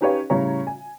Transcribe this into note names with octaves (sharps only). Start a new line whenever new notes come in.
C#4 D#4 G4 B4 C#5 F5
A2 C#3 G3 C#5 A#5
G#5